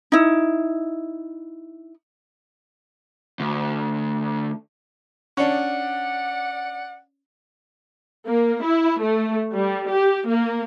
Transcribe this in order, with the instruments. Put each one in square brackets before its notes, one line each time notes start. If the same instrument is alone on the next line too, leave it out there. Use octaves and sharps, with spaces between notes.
[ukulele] D#4 E4
[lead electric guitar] D2
[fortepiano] C#4 D4 [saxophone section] D5 F#5
[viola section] A#3
E4
A3
G3
G4
A#3